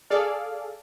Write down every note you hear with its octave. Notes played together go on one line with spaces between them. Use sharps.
G#4 A4 D5 F5